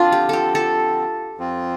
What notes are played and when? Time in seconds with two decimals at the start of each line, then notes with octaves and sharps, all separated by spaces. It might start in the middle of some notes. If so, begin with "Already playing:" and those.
Already playing: D3 F3 C4 D4 F4
0.12 G4
0.29 G4 A4
0.55 A4
1.38 F2 F3 C4 F4